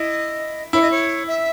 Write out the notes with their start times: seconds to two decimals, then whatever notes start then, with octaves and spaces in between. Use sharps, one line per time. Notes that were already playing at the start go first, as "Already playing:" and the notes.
Already playing: E4 D#5
0.73 E4 C#5
0.82 D#5
0.91 C#5
1.27 E5